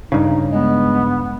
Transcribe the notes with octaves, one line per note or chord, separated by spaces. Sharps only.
G2 C#3 D#4
G#3 B3